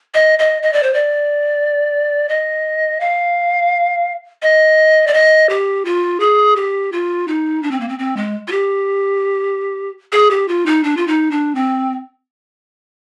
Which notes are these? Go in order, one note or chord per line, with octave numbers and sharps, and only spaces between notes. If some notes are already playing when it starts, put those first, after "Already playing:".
D#5
D#5
D#5
D5
C5
D5
D#5
F5
D#5
D5
D#5
G4
F4
G#4
G4
F4
D#4
D4
C4
A#3
C4
C4
G#3
F4
G4
G#4
G4
F4
D#4
D4
F4
D#4
D4
C4